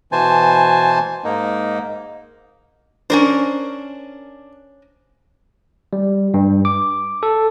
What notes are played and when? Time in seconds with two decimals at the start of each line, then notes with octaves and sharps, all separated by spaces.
0.12 B2 E3 C5 G#5 A5
1.24 G#2 A#3 D#4
3.10 C#4 D4 A#4 C5
5.93 G3
6.34 G2
6.65 D6
7.23 A4